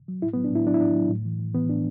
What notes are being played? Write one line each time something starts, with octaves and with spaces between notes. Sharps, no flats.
F#3
A2 E4
B3
F#3
D4
A2 E4
F#3 D4
E4
A2 D4
F#3
A2
E3
A2
E3 B3
A2 D4